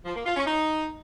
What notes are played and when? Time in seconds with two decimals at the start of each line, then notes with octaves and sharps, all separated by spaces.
0.05 F3
0.15 A#3
0.26 F4
0.36 C#4
0.46 D#4